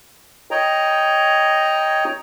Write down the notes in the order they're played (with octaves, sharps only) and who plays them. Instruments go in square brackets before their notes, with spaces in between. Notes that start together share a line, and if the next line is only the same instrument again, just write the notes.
[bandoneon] C#5 D#5 G5 A#5